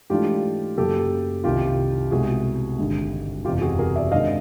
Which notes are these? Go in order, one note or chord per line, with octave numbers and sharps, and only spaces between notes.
G#2 E3 A3 D4 F4 G4
F#2 C#3 F#3 A#3 G4 A4
C2 C3 D#3 F4 G4
C2 B2 G#3 C4 F#4 G#4
G#1 G2 D3
F#1 E2 C3 F4 G4
F#4 G#4
G#4 A#4
D5 E5
G2 D#3 G#3 C4 D#5 F5